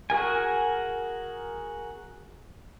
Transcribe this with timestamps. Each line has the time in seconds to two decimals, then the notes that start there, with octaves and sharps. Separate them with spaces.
0.10 F#4 G#4 A#4 G#5